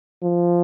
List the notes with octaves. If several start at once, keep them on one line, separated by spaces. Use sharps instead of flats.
F3